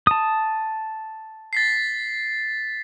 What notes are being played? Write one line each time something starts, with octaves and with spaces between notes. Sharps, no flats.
A5 D#6
A6 B6 C7